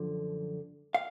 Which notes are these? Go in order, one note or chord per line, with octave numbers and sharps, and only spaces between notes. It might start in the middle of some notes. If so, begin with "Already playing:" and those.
Already playing: F#2 D3 F3
F5